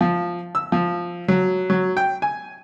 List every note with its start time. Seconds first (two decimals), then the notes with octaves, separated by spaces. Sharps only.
0.01 F3
0.55 E6
0.72 F3
1.28 F#3
1.70 F#3
1.97 G5
2.22 G#5